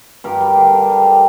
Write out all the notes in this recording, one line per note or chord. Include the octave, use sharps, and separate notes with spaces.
G2 G4 A#4
G3
D3
D3
G3
G3